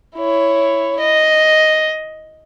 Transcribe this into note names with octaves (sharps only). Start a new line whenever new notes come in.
E4 C#5
D#5